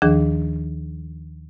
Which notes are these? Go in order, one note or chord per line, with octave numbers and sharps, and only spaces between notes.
D#2 D#3 F3 D4 G#4